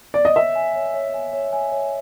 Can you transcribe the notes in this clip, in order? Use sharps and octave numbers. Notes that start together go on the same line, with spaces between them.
D5
D#5
C#5 E5
G#5
C#5
C#5
G#5
C#5
G#5
C#5